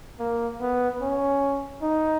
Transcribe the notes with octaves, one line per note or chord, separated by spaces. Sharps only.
A#3
B3
C#4
D#4